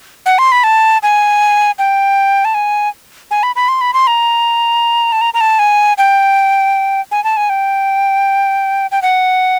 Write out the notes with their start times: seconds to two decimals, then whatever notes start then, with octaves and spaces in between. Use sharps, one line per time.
0.26 F#5
0.39 C6
0.52 B5
0.64 A5
1.03 G#5
1.79 G5
2.45 A5
2.54 G#5
3.31 G#5
3.43 B5
3.56 B5
3.68 C6
3.81 B5
3.94 C6
4.07 A#5
5.12 A5
5.21 A#5
5.34 A#5
5.41 A5
5.59 G#5
5.98 G5
7.11 G#5
7.24 A5
7.37 G#5
7.50 G5
8.92 G5
9.02 F#5